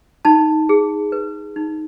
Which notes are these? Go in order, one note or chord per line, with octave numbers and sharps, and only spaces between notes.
D#4 A5
G#4
B4
D#4